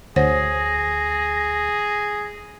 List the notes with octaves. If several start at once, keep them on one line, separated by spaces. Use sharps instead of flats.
D2 G#4 C5 C#5 F#5 A#6